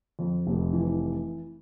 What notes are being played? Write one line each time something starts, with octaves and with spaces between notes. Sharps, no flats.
F2
F1
E3